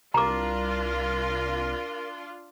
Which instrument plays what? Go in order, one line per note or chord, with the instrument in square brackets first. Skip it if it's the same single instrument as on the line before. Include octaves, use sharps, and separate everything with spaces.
[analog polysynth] C2 [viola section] D4 F4 [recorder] A#4 [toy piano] A#5 D6